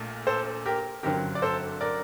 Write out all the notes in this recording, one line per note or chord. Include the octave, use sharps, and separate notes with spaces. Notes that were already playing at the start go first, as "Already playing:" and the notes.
Already playing: A#1 A#2 A3
A4 C5
G4 A#4
G1 F#2 D3 F#3 C4 G4 A#4
D5
A4 C5
A#4 D5